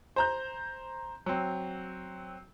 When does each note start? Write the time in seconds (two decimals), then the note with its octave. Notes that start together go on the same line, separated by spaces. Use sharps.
0.16 C5 A#5 G6
1.26 F#3 C4